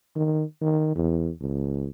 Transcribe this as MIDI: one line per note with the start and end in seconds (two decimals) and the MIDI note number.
0.16 0.43 51
0.61 0.91 51
0.95 1.31 40
1.40 1.89 37